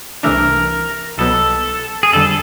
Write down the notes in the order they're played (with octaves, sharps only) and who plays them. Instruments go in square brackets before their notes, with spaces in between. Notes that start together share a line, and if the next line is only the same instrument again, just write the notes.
[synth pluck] C2 C3 E3 A3 D4 [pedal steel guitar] A#4
[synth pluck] C2 B2 F#3 B3 [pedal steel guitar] A4
[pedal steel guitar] G#4
[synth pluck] F2 D3 G3 [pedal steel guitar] A4